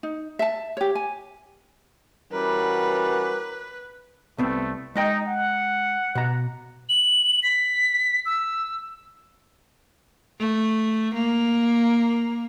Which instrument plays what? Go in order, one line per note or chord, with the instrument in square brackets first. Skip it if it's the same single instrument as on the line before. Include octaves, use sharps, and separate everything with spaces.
[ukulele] D#4
E5 A5
G4 C#5
G#5
[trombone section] E3 C#4 F#4 [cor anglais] G3 [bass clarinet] A#4 [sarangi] B4
[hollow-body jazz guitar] C2 B3 C4 [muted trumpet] A3
[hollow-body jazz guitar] G#3 D#5 G5 [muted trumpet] D#4
[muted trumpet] F#5
[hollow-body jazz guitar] B2 A#5
[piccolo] F#7
B6
E6
[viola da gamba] A3
A#3